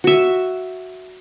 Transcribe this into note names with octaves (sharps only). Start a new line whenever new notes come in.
F#4 E5